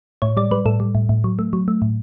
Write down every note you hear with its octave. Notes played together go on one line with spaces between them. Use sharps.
A2 C#5
G3 D5
G3 B4
A2 A4
G3
A2
A2
F#3
A3
F#3
A3
A2